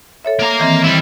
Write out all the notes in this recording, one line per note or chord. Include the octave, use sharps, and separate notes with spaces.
A4 C#5 E5
A#3 A#5
D#3 E3 C4
G3 E4